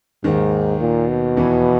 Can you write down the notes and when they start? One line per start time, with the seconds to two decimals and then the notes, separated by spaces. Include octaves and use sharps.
0.24 D#2 G#2 D#3
0.81 A#2
1.09 B2
1.37 E2 E3